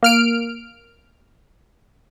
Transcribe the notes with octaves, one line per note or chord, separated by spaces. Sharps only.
A#3 F6 D7